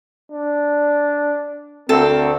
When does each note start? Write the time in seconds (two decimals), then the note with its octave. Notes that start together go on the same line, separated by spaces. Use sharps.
0.32 D4
1.89 D2 C4 A4 A#4